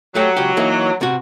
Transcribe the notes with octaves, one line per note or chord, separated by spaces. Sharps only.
F#3 A3 G4
C#2 G4
E3 A#3 D#4
C3 F#4